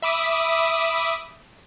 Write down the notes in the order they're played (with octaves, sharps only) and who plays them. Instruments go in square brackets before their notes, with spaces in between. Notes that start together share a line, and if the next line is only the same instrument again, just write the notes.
[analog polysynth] E5 B5 D6 D#6